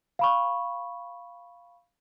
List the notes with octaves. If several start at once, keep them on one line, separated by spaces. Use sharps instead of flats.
F5 B5 C#6